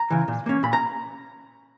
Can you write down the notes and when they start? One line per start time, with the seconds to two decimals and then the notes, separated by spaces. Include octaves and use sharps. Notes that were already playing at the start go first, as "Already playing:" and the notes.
Already playing: A#5
0.10 C#3 E3
0.28 A#2
0.46 A#3 C#4
0.63 A#2 B5
0.73 A#5